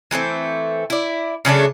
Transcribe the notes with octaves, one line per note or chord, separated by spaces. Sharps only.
E3 G#3 A3 C4
E4 D5
C#3 F#3 A3 D4